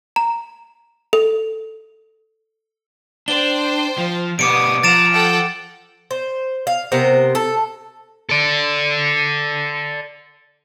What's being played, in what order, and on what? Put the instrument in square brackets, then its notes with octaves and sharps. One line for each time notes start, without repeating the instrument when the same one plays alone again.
[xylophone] A#5
A4
[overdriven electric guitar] D4 [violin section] C5 G5 [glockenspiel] G7
[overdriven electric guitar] F3
[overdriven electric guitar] B2 G3 [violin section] B3 D#6 [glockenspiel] D6 C#7 D7
[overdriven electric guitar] F3 [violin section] F#5 A#5 [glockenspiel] A6 D7 E7
[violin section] A4 F#5 G5
[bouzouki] C5
F5
C3 B3 A#4 C5
A4
[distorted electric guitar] A4 D5